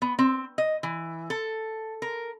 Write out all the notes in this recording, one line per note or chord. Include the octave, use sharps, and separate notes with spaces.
B3
C4
D#5
E3
A4
A#4